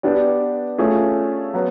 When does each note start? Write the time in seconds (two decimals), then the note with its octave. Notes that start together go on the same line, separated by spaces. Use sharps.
0.03 B3 D4 G4 B4 D5
0.78 A3 C#4 F4 G#4
1.54 F#3 B3